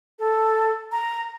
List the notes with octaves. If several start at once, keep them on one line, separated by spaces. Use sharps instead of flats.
A4
A#5